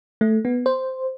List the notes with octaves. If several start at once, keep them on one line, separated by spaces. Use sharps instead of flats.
A3
B3
C5